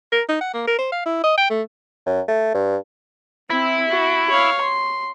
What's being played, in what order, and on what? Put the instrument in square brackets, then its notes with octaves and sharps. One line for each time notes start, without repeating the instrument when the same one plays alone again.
[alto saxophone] A#4
D#4
F#5
A#3
A#4
C5
F5
E4
D#5
G5
A3
[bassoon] F#2
A3
G2
[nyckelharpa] C4 [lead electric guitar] E4
[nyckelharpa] F#4
C#5 F5
C6